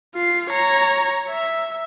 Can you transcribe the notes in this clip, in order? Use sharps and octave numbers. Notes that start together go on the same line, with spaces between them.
F4 C7
C#5 A#5
E5